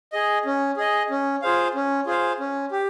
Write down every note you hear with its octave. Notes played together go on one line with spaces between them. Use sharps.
G#4 D#5
C#4
G#4 D#5
C#4
F4 G#4 C5 F5
C#4
F4 G#4 C5 F5
C#4
G4